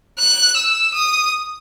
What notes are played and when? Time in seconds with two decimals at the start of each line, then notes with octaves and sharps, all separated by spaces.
0.19 F#6
0.57 E6
0.94 D#6